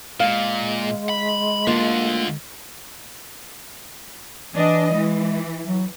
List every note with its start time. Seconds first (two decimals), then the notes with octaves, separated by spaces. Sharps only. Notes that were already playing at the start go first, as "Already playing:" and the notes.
0.20 A#2 G#3 F5
1.09 B5
1.67 D2 D3 A#3 F4
4.54 E3 D4 D#5
4.93 E3 G#3
5.65 F#3